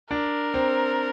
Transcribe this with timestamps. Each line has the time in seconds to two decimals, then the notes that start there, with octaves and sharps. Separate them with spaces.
0.11 D4 A#4
0.54 C4